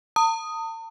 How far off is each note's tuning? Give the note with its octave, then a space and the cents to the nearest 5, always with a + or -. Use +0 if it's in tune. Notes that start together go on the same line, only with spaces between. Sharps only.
A5 +45 D#6 +0